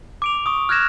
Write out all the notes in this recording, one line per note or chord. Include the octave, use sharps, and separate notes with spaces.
D6 D7 F7
C#6 D#6
F6 F#6 G#6 A#6 E7 F7